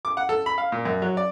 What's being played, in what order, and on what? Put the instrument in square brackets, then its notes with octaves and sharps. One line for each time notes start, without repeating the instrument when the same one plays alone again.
[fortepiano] D6
F#5
A4
B5
F5
A#2
F#2
F#3
D5